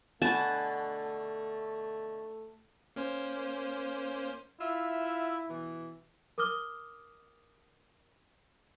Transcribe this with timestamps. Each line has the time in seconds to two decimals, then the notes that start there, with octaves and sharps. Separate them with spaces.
0.22 B2 D3 A3 B4 F#5 G#5 A5
2.96 A#3 C#4 C5
4.60 E4 F4 E5
5.49 B2 E3
6.38 A#4 D6 D#6 F6 G7